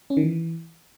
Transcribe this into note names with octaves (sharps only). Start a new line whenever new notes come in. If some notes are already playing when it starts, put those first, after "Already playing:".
C#4
D#3
E3